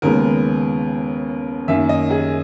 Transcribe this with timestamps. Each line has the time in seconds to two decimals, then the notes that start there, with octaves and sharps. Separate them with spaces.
0.02 D#2 C#3 G#3 B3 A#4
1.68 F#2 D#3 A#3 E5
1.89 D#5
2.11 G#4